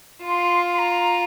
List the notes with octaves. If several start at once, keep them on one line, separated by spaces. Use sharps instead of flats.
F4 C6
C6
A#5